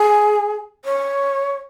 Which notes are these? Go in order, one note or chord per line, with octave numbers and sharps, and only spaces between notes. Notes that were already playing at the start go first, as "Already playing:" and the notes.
Already playing: G#4
C#5